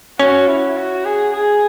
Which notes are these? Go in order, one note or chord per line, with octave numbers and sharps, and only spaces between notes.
C#4 F#4
E4
F#4
G#4
G#4